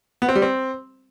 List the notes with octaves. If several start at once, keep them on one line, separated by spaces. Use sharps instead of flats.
B3
C4
G3
C4